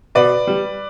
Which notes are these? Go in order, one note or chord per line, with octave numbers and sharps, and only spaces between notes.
B2 B4 D5
G3